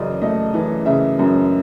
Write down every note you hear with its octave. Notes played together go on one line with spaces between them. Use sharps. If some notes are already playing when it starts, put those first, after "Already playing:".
Already playing: F#2 C#3 E3 D5 D#5
A3 D#5
E3
C#3 E5
F#2